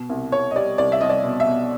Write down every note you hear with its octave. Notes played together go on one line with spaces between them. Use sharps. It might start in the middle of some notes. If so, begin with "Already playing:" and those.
Already playing: B2
C2
C2 C#5
D#5
G3 D5
C2 D5
E5
C2 D#5
D5
B2
E5
B2